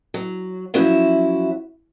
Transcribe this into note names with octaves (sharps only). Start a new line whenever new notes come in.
F#3
F3 F#3 C#4 E4 F#4 E5